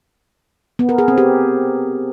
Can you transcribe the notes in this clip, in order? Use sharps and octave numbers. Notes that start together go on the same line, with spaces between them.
B3
A#4
G#4
C4
G4